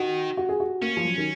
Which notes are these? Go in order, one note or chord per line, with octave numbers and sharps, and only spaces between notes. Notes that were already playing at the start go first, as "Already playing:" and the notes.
Already playing: D#3 F#4
F#4
G#4
F#4
A#3 C#4
F3
F#3
D#3